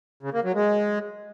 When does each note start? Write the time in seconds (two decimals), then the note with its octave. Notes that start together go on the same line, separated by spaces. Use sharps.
0.23 C#3
0.33 A#3
0.44 F#3
0.55 G#3